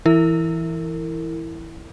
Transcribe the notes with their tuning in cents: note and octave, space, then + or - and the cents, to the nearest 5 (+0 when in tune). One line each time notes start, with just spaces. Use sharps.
E3 +0 E4 -5 A#4 -30